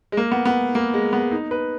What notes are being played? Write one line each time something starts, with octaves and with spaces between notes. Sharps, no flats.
G#3
A#3
B3
B3
A#3
G#3
B3
D#4
B4